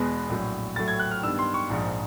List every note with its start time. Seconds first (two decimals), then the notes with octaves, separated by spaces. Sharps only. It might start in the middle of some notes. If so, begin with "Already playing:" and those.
Already playing: E2 B2 G#3 B3
0.29 A#1 A2 F#3
0.76 A2 F#3 A3 A6
0.88 G#6
0.99 F#6
1.11 F6
1.23 G2 D#3 G3 B3 E6
1.39 C6
1.54 C#6
1.70 A#1 G#2 F3